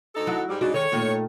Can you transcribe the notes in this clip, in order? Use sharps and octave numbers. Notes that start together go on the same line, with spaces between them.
D2 D#4 A4
F#3 E4
G#2 G3
C#3 G#3 D4 D#4 F#4 D5
D#3 G#3 A4 C#5
A#2 D#3 A3